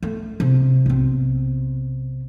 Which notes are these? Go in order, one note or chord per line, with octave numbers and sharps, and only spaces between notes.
A3
C3
B1 C3